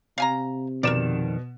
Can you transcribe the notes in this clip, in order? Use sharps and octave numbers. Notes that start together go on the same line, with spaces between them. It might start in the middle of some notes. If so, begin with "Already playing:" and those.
C3 F5 G#5 A#5
F2 B2 D#3 A#4 D5 E7